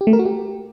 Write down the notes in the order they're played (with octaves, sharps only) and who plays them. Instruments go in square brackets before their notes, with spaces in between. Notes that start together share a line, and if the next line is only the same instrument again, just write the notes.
[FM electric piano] G4
A3
A#4
F#4
G4